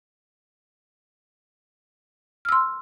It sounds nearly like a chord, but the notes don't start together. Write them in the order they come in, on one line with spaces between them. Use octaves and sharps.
F6 E6 C6